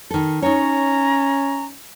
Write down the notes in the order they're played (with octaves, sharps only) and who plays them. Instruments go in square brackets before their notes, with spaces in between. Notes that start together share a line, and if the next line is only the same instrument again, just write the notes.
[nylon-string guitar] D#3 A4
[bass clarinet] C#4 [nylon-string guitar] D#4 C#5 [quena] A#5